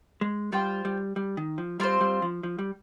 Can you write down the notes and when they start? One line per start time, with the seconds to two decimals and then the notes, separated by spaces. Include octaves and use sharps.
0.21 G#3
0.52 G3 F4 C5 G5
0.85 G3
1.16 G3
1.37 D#3
1.58 F3
1.80 G3 C4 F4 C5
2.01 G3
2.22 F3
2.43 F3
2.59 G3